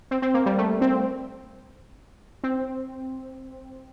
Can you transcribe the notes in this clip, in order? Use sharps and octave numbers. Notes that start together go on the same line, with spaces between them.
C4
C4
A#3
G3
A3
C4
C4